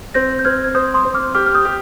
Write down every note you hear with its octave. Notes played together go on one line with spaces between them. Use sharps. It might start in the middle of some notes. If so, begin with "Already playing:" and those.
C4 G6 A#6
G6
C4 F6 G#6
G#6
C5 D#6 G6
C6 D#6
C4
D6 F6
G4 D6 F6
F6
D#6 G6
G4